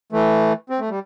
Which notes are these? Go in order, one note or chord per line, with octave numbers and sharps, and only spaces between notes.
E3 A3
C4
A3
G3